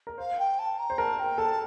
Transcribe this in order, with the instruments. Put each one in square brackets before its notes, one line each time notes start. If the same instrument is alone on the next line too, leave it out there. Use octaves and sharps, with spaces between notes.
[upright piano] A#4
[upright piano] C5 [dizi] F5
[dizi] G5
A5
A#5
[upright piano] C5
[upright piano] A#4 [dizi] A5
[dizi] G5
[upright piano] A4 [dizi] A5